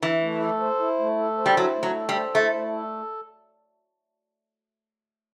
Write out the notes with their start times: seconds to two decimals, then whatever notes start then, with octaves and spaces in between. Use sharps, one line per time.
0.02 E3 E4
0.21 A3
0.41 A4
0.60 C5
0.79 E4
0.99 A3
1.18 A4
1.38 C5
1.46 G3
1.57 F#3 E4
1.76 A3
1.83 F#3
1.95 A4
2.09 G3
2.15 C5
2.34 A3 E4
2.53 A3
2.72 A4